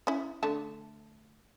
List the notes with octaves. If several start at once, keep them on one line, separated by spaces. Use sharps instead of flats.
C#4 E4
D3 A3 A5